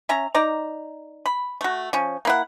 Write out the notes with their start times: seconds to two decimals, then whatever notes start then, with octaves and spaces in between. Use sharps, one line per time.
0.09 C#4 E5 A#5
0.34 D#4 D5 A#5
1.26 B5
1.61 A3 F#4
1.93 F3 C#4
2.25 A#3 E4 F#5